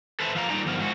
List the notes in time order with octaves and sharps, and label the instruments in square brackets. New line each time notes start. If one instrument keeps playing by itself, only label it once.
[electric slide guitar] A4 B4 C5 E5
F3 A3 F5 G5 A#5
A#2 D#3 G3 D#4 D5 A#5
G2 F3 B3 A#4
F3 G#3 F#4